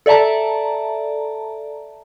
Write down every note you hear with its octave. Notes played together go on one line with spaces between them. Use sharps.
A4 D5 E5 A5 A#5